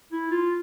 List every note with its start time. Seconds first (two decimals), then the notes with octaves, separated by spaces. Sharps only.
0.12 E4
0.31 F4